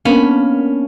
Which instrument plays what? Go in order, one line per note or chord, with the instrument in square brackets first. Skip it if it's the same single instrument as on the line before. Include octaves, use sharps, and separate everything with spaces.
[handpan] A#3 B3 D4 [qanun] C#4 B5